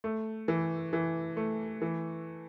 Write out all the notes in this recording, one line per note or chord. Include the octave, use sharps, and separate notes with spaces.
A3
E3
E3
A3
E3